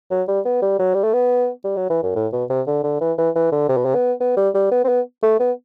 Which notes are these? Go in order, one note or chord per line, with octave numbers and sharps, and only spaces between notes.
F#3
G3
B3
G3
F#3
G3
A3
B3
G3
F#3
E3
F#2
A2
B2
C3
D3
D3
E3
E3
E3
D3
C3
B2
C3
B3
B3
G3
G3
B3
C4
B3
A3
B3